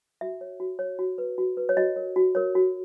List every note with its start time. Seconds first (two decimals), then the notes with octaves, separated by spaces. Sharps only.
0.21 F#4 E5
0.41 C#5
0.60 F#4
0.79 C#5
0.99 F#4
1.18 B4
1.38 F#4
1.57 B4
1.69 C#5
1.77 F#4 D#5
1.96 A#4 C#5
2.16 F#4
2.35 A#4 C#5
2.55 F#4